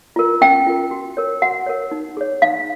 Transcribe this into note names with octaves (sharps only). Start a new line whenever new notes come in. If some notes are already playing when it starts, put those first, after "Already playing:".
F4 A#4
C#4 G5
F4 A#4
F#4
A#4 C#5
F#4 F#5
A#4 C#5
D#4
G#4 C#5
D#4 F5